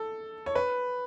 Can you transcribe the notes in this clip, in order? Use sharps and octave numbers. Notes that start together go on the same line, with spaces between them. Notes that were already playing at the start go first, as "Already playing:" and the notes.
Already playing: A4
C#5
B4